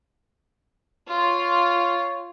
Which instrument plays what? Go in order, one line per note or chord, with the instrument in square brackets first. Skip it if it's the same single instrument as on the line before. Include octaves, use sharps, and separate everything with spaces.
[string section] F4 [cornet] C#5